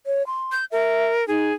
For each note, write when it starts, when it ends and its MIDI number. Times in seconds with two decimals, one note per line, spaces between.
0.06 0.26 73
0.27 0.55 84
0.52 0.65 91
0.72 1.27 70
0.72 1.06 76
1.28 1.50 63
1.28 1.54 68